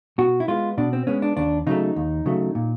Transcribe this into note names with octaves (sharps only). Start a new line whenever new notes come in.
B2 F#4
E4
G#3 B3 F4
B2 D4
C4
G#3 B3 C#4
D4
D#2 D4
C#3 F#3 A3 D#4
D#2
C#3 F#3 A3
A#2